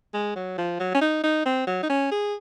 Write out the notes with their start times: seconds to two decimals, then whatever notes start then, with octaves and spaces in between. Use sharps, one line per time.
0.14 G#3
0.36 F#3
0.58 F3
0.80 F#3
0.94 C#4
1.01 D#4
1.24 D#4
1.46 C4
1.67 F#3
1.83 D#4
1.90 C#4
2.12 G#4